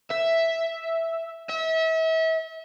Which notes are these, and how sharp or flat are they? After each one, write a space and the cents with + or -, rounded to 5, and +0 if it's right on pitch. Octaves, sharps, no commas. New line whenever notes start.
E5 +0
E5 -35